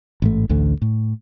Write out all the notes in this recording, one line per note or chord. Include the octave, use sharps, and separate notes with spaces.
A1 G#2 A3
A1 D2 D3 A3
A2